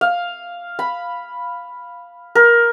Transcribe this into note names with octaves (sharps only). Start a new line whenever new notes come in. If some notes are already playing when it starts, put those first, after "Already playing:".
F5
B5
A#4